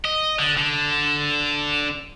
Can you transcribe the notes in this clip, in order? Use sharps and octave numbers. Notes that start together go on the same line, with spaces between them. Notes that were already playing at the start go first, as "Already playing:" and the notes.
D#5
D3
D3